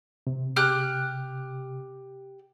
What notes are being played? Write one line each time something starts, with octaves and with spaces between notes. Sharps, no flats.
C3
G4 F6 F#6